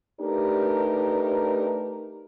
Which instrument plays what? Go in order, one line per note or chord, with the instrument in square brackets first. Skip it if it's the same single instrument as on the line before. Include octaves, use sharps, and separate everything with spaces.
[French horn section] A3 D4 D#4 G4 A#4 B4